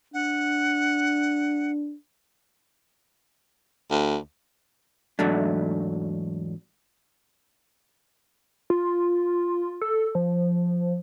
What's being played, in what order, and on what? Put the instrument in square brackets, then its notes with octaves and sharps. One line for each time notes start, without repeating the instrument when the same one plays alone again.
[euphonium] D4 [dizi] F#5
[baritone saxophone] D2
[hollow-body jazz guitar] E2 G#2 F#3 A3 D4
[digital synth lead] F4
A4
F3